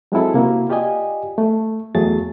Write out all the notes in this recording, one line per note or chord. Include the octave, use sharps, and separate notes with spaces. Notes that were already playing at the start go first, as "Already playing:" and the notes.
F#3 G#3 C4 E4 A4
C3 A#3 E4 F#4
F4 G4 D5 D#5 G#5
A3
E2 E3 F#3 A3 G#4 A6